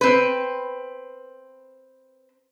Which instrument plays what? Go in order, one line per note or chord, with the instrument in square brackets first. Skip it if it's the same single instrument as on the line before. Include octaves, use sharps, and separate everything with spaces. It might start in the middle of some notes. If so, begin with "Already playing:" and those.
[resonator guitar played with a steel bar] C4 B4